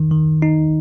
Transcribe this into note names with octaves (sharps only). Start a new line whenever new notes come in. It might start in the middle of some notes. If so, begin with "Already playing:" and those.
Already playing: D#3
D#3
D#4